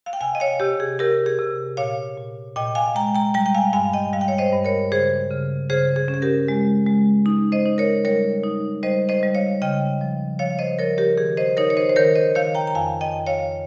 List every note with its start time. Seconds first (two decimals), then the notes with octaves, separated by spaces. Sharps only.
0.06 F5
0.13 G5
0.21 C3 F5 G#5
0.35 D#5
0.40 C#5 F5
0.60 C3 G4
0.80 G#4
0.99 C3 G4 A#4
1.26 G#4
1.39 C3
1.77 A#2 C#5 F5
2.18 A#2
2.56 A#2 D#5 G5
2.75 F5 G#5
2.95 G#3 G5 A#5
3.14 G5 A#5
3.34 G3 G5 A#5
3.46 G5
3.54 F5 G#5
3.73 G2 F5 G#5
3.93 D#5 G5
4.13 G3 F5
4.21 G5
4.28 C#5 F5
4.38 C5 D#5
4.53 G2
4.65 A#4 C#5
4.91 C#3 G#4 C5
5.31 C#3
5.70 C#3 G#4 C5
5.96 G#4
6.08 C#4
6.14 G#4
6.22 G4 A#4
6.48 G#3
6.87 G#3
7.26 D#4
7.52 C5 D#5
7.65 D#4
7.78 A#4 C#5
8.05 G3 A#4 C#5
8.43 D#4
8.83 G3 C5 D#5
9.09 C5 D#5
9.23 G3
9.35 C#5 F5
9.62 C#3 D#5 G5
10.01 F3
10.39 F3 C#5 F5
10.59 C5 D#5
10.79 F3 A#4 C#5
10.98 G4 A#4
11.18 D#3 G#4
11.37 C5 D#5
11.57 D#4 A#4 C#5
11.70 C#5
11.77 C5 D#5
11.89 C5
11.96 D#3 A#4 C#5
12.15 C5 D#5
12.35 D#3 C#5 F5
12.55 G5 A#5
12.67 A#5
12.75 F2 F5 G#5
13.01 D#5 G5
13.14 F2
13.27 C#5 F5